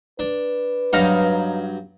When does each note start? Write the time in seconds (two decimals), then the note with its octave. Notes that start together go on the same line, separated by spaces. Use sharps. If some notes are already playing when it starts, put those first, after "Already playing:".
0.19 D4 B4
0.93 G2 F#3 D#4 F5 A#5